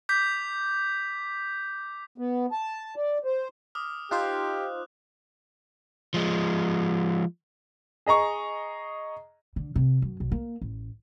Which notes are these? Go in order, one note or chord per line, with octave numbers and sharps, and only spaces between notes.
D6 G6 B6
B3
A5
D5
C5
D6 D#6 F6
D#4 F4 G4 C5 F#6
F3 G#3
G#4 D#5 A#5 C#6
D3
C3
F#2
B1
A#3
A1